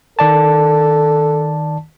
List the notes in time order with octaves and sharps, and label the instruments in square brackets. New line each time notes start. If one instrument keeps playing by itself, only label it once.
[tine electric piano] D#3 D5 A5 [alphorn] A4